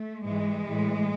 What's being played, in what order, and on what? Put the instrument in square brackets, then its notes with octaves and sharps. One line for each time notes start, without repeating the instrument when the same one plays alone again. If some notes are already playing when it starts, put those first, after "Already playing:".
Already playing: [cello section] A3
G#2 E3 G#3
A2 E3